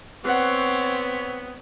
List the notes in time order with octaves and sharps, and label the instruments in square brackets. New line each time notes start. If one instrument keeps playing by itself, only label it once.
[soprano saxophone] B3 [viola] C4 C#5 [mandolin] F#5 F#6